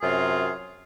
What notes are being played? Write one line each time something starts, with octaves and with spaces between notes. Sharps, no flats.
F#2 C3 F4 G#4